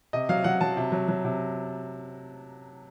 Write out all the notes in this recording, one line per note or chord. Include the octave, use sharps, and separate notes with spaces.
C3 D#5
F#3 F5
F#3 F#5
F#3 A5
C3
F#3
F#3
C3